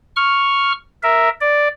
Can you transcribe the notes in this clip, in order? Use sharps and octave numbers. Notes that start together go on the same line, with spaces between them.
C#6 F6
A#4 E5
D5